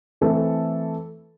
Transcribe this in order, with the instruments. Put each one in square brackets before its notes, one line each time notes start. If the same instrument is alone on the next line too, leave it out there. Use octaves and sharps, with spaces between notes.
[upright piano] E3 A3 C4 E4 A4